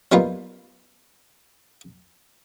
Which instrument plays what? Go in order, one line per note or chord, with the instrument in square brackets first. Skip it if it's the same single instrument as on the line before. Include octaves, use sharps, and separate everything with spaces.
[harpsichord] F#3 G3 A#3 B3 D#4 F4